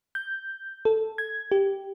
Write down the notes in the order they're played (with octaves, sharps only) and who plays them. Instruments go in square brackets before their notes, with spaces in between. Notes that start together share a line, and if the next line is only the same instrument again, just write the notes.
[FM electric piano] G6
A4
G#6
G4